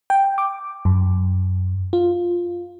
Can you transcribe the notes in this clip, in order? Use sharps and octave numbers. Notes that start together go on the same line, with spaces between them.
G5
D6
F#2
F4